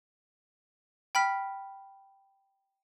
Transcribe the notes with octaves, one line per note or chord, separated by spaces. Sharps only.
G5 B5 F6 B6